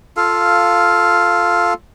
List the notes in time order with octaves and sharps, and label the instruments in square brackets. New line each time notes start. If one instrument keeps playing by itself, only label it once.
[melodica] F4 A4 F5